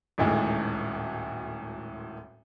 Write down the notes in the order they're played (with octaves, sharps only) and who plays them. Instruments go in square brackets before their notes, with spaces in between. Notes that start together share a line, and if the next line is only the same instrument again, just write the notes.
[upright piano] D#1 G#1 D2 A2 G#3